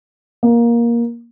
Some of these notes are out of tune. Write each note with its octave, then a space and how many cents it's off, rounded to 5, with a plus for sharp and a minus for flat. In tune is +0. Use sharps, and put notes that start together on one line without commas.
A#3 +15